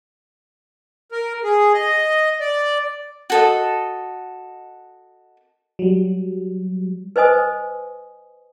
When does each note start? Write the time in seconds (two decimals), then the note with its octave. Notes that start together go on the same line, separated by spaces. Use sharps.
1.12 A#4
1.44 G#4
1.74 D#5
2.40 D5
3.30 F#4 A4 D#5
5.79 F#3 G3
7.16 B4 C5 D#5 G#5 D#6